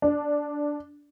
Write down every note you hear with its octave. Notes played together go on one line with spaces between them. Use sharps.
D4